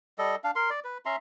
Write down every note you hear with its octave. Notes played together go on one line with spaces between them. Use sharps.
G3 A4 D#5
D4 F5
A#4 C6
D5
B4
C#4 E5 A#5 C6